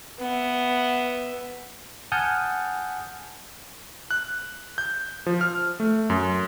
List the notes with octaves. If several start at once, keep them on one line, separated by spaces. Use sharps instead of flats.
B3 E5
F#5 G#5 A5 D#6 F6 G6
F#6
G6
F3
F6
A3
F#2